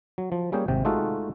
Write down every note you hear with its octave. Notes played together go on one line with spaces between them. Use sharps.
F#3
F3
G3 A#3 C#4 G#4 G5
G#1 C3 G5
G#3 A3 D#4 F4 F#4 A4